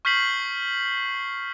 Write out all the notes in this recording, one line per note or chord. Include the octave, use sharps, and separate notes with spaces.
C#6 F6 G6 B6 C7 F#7